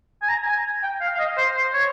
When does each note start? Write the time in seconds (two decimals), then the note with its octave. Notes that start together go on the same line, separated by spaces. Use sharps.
0.22 G#5
0.29 A#5
0.46 G#5
0.83 G5
1.01 F5
1.15 F5
1.19 D#5
1.37 C5
1.56 C5
1.73 C#5